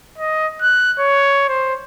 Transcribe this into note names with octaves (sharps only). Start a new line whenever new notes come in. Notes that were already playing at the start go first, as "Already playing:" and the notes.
D#5
F#6
C#5
C5